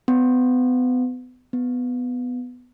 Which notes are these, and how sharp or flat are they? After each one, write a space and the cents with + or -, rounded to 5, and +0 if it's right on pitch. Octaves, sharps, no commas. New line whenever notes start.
B3 +30
B3 +10